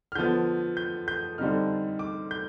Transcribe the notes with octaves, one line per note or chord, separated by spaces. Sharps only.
F6
D3 F3 B3 G6
G6
G6
D3 G3 C4 D#4 F6
D6
G6